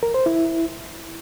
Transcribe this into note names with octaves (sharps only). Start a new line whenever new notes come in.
A#4
C5
E4